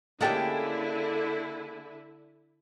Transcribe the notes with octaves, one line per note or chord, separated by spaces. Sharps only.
D3 G#3 A#3 C#4 E4 G4 A4 G5